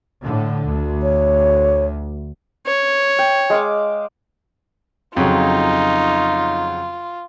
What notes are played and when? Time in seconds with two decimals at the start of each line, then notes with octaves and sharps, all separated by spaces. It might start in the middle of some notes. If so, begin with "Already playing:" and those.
0.21 A2 D3
0.66 D2
1.03 C#5
2.67 C#5
3.19 G5
3.50 G#3 F5 D6
5.17 F2 C#3 F#3 D#4 F4